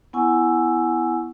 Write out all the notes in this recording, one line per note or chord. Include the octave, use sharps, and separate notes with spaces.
B3 E4 F#5 G#5 C#6 E6